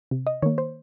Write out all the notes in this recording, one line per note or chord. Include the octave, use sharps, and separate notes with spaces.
C3
D#5
D#3 A#3 C#5
C5